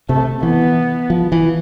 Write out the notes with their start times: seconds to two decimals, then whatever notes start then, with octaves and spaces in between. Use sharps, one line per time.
0.09 C3 A3
0.43 E3 B3
1.10 F3
1.32 E3